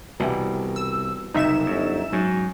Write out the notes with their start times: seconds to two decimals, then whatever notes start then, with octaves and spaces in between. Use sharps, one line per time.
0.20 C2 B2 E3 G3
0.76 E6
1.34 F#1 C2 D#4 E5 E7
1.66 G1 F#2
2.12 G#2 F#3 C#4